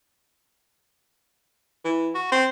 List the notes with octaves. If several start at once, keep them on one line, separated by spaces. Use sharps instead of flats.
E3
F#4
C4